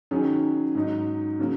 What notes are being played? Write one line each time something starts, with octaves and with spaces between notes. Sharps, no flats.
D#3 F#3 C#4 G#4
G#2 F#3 D#4
C#3 F#3 A#3